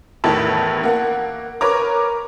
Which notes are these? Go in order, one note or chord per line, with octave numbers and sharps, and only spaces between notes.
A1 E2 D#3 A3 E4 A5
A#3 F#5
A#4 B4 C#5 A#5 D6